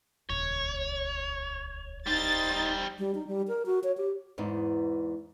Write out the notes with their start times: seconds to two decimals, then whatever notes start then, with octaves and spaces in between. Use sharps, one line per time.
0.30 D#1 C#2 C#5
2.06 G3 D#4 C5 A6
2.99 G3
3.15 D#4
3.27 G3
3.48 A#4
3.66 F#4
3.84 C#5
3.97 G4
4.38 E2 G#2 B3 D#4